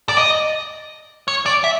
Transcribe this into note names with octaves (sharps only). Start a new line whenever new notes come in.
D5
D#5
C#5
D5
E5